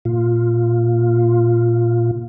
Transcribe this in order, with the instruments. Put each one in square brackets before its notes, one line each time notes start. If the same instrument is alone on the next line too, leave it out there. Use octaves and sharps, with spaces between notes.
[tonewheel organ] A#2 F4